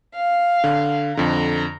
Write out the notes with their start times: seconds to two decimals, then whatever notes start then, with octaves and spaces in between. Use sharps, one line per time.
0.15 F5
0.64 D3
1.17 F2 D3 A#5